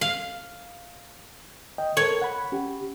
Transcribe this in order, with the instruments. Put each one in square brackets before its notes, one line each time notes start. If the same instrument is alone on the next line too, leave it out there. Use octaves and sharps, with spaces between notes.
[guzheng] F5
[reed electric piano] D#5 G5
[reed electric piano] A4 A#4 [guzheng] C#5
[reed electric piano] F#5 B5
C#4 G4